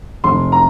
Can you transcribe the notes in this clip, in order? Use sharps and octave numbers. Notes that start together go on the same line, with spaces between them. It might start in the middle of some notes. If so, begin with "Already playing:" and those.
F1 C6
A#5